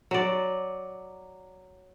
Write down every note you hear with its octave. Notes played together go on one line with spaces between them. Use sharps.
F#3 D5